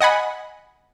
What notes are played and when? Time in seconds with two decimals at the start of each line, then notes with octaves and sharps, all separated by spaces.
0.01 D#5 F#5 G#5 B5